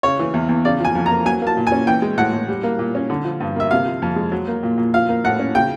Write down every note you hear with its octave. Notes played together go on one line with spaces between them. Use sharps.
C#3 C#5
E3
E2
E2
C#3 D5
F3 G#5
F2
A#5
A#3
F#3 G#5
A#3 A5
A#2
G#5
C#4
E3 G5
G#3
A2 F#5
A2
G3
A#3
A#2
C#4
D3
F3
G2
A#3 E5
C3 F5
F3
F2
G#3
F#3
A#3
A#2
A#2
F3 F5
A#3
A2 F#5
C#4
C#3 G5